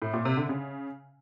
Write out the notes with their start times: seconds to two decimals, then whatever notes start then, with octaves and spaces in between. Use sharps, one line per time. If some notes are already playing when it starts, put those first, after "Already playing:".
0.02 A2
0.13 A#2
0.25 C3
0.37 D3
0.49 C#3